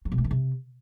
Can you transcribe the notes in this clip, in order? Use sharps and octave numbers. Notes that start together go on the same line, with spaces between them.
F#3
B2
A3
D#3
C3